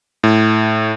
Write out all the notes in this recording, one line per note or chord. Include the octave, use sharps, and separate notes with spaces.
A2